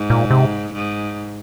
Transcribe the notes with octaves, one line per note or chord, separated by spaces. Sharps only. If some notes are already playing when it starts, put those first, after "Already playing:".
Already playing: G#2
A#2
C3
G#2